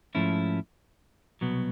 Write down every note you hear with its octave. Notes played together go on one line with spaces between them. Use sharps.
G#2 F3 A3 C#4 E4
C2 B2 F#3 B3